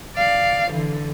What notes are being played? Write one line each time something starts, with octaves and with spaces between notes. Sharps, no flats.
D5 F5
D3 E3